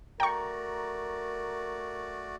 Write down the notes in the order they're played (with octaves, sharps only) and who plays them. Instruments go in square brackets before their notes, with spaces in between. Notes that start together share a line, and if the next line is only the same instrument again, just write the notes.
[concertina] A3 F#4 D5 [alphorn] A#4 [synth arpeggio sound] G5 C#6 [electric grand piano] A#5